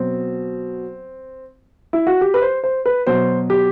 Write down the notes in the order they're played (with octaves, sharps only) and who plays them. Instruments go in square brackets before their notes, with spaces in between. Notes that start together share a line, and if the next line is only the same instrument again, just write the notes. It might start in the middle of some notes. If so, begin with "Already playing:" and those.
Already playing: [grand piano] B2 F#3 C4
E4
F#4
G4
B4
C5
C5
B4
B2 F#3 C5
G4